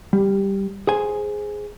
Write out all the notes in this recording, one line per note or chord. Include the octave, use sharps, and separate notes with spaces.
G3
G#4 C5 G#5